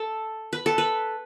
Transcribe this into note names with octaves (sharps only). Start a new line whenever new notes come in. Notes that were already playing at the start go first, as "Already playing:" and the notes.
Already playing: A4
B4
A4
B4